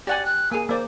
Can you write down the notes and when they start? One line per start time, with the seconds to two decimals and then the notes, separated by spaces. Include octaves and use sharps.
0.07 G4 D5 F#5 G#5
0.25 F#6
0.52 A#3 G#4 G#5
0.69 A#3 C5 D5